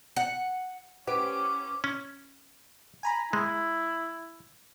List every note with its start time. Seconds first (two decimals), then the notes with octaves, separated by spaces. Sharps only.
0.16 F#5
1.07 C#4 G4 B4 C5 F#5 D6
1.84 C#4
3.03 G#5 A#5 B5
3.33 G#3 E4